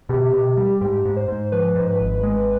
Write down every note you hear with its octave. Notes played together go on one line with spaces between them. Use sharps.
B2 G4
B2
G3
G#2 G4
G#2
C5
G#2
F3 B4
G#2 C5
B4
G#1
G#3